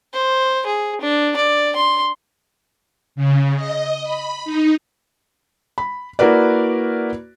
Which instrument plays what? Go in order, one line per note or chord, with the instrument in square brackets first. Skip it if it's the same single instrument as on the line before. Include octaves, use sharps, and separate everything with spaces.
[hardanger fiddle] C5
G#4
D4
D5
C6
[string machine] C#3
D#5
B5
D#4
[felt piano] B5
A#3 E4 F#4 A#4 B4 D5